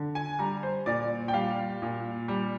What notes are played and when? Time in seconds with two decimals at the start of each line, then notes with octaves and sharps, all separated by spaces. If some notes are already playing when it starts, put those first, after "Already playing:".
Already playing: D3
0.15 G#5
0.39 G3 A#5
0.63 C5
0.86 A#2 D5
1.28 G5
1.33 G3 F5
1.82 A#2
2.28 G3